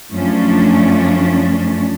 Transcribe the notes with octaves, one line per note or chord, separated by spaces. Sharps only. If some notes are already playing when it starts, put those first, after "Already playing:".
F#2 F3 A3 C#4 D4